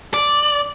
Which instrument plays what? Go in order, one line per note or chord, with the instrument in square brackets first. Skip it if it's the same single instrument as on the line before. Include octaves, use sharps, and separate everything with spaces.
[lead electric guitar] D5